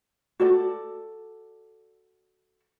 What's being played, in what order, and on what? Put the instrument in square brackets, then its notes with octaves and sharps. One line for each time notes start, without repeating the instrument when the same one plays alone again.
[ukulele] F#4 A4 D5